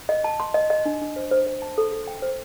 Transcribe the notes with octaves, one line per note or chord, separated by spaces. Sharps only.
D#5
A5
C6
D#5
D#5
D4
D4
C5
C5
C5
A5
A4
A4
G5
C5